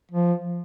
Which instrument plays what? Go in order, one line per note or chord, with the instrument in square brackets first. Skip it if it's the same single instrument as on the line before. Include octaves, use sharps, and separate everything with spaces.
[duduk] F3